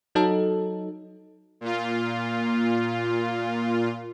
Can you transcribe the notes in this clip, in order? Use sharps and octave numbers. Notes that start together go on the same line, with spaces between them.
F#3 D#4 A4
A#2 F4